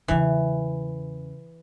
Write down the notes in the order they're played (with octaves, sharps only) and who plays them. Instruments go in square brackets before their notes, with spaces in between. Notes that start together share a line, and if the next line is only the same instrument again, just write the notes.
[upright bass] E2 C#3 [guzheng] E3